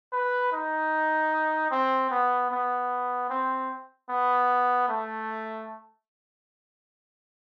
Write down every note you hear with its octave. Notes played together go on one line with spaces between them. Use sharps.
B4
D#4
C4
B3
B3
C4
B3
A3